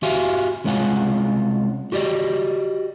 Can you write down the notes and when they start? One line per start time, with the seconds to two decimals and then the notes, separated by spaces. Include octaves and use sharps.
0.03 F#4 G4 E5 F5 G#5 C6
0.64 C2 G#3 C#4 F4 F#5 G#5
1.92 F#4 G4 D5 D#5